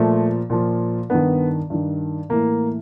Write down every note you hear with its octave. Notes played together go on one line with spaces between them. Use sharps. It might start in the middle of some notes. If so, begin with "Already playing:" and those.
Already playing: A#2 F3 A3
A#2 F3
G2 D#3 B3
G2 D#3
A2 E3 A#3